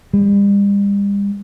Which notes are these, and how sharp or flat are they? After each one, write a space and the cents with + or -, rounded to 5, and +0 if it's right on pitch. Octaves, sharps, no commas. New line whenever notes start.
G3 +40